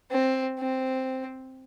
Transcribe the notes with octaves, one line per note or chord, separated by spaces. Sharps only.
C4
C4